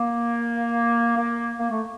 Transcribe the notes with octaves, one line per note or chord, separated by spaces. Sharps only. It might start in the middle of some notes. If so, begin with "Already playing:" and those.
Already playing: A#3
A#3
A#3
A3